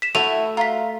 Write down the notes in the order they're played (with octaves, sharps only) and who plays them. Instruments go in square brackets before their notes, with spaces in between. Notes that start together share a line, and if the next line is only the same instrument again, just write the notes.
[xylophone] B6 E7
[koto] A3 [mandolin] E4 [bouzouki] F#4 E5 [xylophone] D#7 F7
[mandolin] F4 [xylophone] A#5 B6